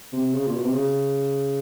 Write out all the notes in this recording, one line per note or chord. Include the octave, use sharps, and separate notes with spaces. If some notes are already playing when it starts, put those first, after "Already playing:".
C3
C#3
A#2
B2
C3
C#3